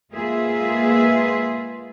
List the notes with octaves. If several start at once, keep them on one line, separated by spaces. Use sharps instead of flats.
G#3 A#3 F4 G#4 B4 E5